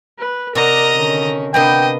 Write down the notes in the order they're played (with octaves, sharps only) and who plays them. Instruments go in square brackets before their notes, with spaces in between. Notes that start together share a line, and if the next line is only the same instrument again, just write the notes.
[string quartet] B4
[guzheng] C3 [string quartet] A#4 D5 F#5 [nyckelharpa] D#5 A#5
[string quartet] D3 D#3 C#4
[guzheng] C3 A#3 B3 [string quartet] D4 [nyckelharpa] D#5 [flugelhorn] G5